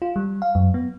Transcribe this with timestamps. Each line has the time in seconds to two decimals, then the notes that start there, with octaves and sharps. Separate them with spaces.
0.02 F4
0.16 G3
0.42 F5
0.55 F#2
0.74 B3